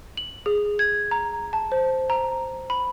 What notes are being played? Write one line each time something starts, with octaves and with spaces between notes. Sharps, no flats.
F#7
G#4
G#6
A#5
A5
C5
A#5
B5